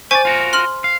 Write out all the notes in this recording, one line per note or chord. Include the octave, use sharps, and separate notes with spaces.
E4 C5 D5 G#5 C#6
F4 F#4 A#4
C6 F6 F#7
F5